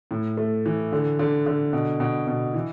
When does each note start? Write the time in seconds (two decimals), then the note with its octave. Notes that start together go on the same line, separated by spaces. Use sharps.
0.11 A2
0.37 A3
0.66 E3
0.92 D3
1.19 D3
1.46 D3
1.73 B2
2.00 B2
2.27 B2
2.54 E3